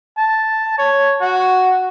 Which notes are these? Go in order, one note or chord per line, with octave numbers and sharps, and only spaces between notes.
A5
C#5
F#4